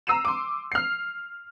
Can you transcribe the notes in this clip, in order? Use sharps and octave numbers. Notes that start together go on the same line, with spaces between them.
A#5 E6 C7 D#7 E7
C6 D6
F6 C7